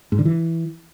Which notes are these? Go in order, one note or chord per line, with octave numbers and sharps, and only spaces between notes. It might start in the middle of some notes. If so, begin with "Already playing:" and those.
G#2
D3
E3